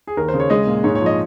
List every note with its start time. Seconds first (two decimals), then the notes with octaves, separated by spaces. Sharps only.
0.07 G#4
0.17 D#2 A#4
0.28 C5
0.34 C#3
0.40 C#5
0.50 G#3 D#5
0.67 A#2
0.84 G#2 C#5
0.95 C#5
1.01 F3 D#5